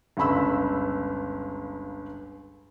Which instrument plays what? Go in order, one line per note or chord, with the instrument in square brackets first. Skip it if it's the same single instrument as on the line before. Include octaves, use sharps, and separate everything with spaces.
[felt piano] G1 C#2 B5 E6